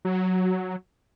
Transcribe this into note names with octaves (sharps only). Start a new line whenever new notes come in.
F#3